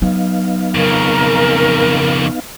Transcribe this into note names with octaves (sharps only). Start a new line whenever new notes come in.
F#3 B3 D#4 F5
F2 C#3 A#4